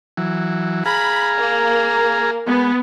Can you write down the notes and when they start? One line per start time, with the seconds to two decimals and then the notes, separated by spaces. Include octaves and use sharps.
0.17 E3 F#3
0.86 G#4 F5 A#5 B5
1.39 A#3
2.47 G#3 B3